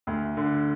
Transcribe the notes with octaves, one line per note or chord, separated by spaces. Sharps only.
D2
D3